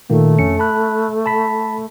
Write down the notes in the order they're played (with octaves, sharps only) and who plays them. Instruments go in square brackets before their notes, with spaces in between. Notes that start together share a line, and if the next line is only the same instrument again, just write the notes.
[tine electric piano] A#2 D#3 A#3 [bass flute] A3
[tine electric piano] F2 C#4 C#7
A5 B5 F#6
A5 B5 B6